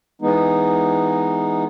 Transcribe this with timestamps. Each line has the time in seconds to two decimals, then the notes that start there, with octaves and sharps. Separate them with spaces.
0.22 E3 G#3 B3 D#4